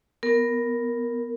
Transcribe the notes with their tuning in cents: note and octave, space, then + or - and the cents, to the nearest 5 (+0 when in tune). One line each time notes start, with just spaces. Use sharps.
B3 +0 A#4 +0